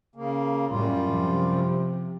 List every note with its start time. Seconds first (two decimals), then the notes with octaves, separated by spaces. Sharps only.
0.15 C#3 A#3
0.70 F#2 A2 G3 F4
1.07 C3 F3